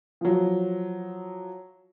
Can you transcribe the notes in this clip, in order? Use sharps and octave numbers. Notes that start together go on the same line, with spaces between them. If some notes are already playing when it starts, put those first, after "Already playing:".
F3 F#3